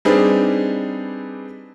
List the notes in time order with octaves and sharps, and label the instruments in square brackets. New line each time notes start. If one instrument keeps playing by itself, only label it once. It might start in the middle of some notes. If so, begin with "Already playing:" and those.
[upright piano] G3 C4 D4 D#4 G#4 B4